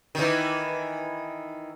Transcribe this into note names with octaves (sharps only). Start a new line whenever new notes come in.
D#3 E3